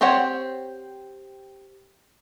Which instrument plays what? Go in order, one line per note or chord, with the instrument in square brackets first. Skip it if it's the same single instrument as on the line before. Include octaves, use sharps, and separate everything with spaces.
[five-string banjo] C4 G4 C5 C#5 F#5